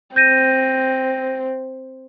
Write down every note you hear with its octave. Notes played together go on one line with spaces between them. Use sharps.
C4 G6 A#6 D#7